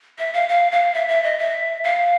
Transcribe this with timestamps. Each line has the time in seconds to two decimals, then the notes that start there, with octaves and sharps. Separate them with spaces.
0.19 E5
0.33 F5
0.49 F5
0.72 F5
0.94 E5
1.08 E5
1.24 D#5
1.38 E5
1.84 F5